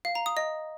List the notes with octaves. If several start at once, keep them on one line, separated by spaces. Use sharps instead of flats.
F5
A#5
D#6
D#5